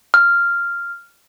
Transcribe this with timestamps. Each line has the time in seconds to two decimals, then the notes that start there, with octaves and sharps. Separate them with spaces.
0.14 F6